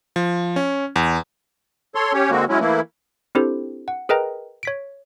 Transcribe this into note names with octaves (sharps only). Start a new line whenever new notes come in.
F3
C#4
E2
A4 C#5 C6
C#4 G4 C#5
D3 G#3 A#3 C4 F#4
F#3 G#3 C#4 E4
E3 A3 A#3 E4
C4 D4 E4 G4 A4 C5
F#5
G#4 A#4 B4 D#5 G5 A#5
C#5 B6 D7